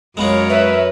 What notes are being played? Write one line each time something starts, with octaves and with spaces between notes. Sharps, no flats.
F#2 G#3 B3 F4 A#4 C#5
B4 E5